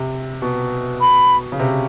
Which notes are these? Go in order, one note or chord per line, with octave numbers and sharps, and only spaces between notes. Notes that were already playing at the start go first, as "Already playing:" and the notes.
Already playing: C3
B2
B5
C#3
C3